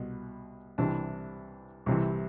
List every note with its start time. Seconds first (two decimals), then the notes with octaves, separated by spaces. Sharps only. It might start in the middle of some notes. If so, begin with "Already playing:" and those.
Already playing: C2 B2
0.78 C2 C3 E3 D4
1.86 C2 C3 E3